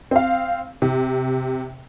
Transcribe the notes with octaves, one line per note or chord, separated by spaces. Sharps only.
C4 F5
C3